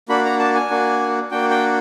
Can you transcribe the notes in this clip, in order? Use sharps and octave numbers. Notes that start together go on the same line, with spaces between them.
A#3 D4 F#4 B5
A#5
A5
G#5
A#3 D4 F#4
A#3 D4 F#4 G5
G5